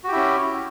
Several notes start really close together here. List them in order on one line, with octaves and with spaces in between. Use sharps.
F#4 G4 E4 C#4